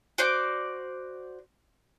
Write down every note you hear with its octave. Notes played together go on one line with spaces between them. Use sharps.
F#4 C5 D5 D6